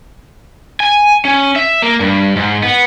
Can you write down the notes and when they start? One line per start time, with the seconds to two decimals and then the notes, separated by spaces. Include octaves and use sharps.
0.80 G#5
1.25 C#4
1.56 E5
1.82 A#3
2.00 G2
2.36 G#2
2.64 B3